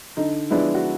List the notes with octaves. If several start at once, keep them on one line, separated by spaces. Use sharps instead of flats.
D3 D#4
F3 G#3 B3 D4 E4
F#4